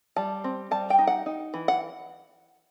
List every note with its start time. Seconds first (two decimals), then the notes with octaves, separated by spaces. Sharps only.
0.16 G3 A5
0.44 C4
0.71 G3 A5
0.90 G5
0.98 D#4
1.07 F#5
1.26 D#4
1.54 E3
1.68 F#5